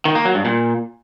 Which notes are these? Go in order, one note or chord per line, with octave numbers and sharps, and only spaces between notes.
D#3
A#3
F#3
G2
A#2